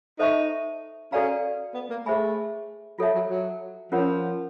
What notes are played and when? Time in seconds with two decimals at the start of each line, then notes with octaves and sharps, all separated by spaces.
0.19 D#4 A4 C5 E5 A5 C#6
1.12 C#4 F#4 A4 D5 F5 A#5
1.74 B3
1.90 A#3
2.06 A3 G#4 C5 E5 G#5 B5
2.99 F#3 F4 A4 C#5 E5 A5
3.15 F#3
3.30 F#3
3.92 F3 C#4 F4 A#4 C#5 F#5